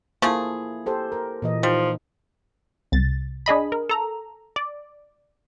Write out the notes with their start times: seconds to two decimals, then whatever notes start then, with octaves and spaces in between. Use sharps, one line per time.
0.22 F3 A3 A#3 E4 G#4
0.86 G4 A4 C5
1.12 A#4
1.42 A#2 E3 D#5
1.63 F3 G3 D#4
2.92 C2 A6
3.46 D4 G#4 D#5 B5
3.72 A#4
3.89 A4 A#5
4.56 D5